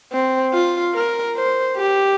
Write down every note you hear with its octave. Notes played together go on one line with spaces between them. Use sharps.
C4
F4
A#4
C5
G4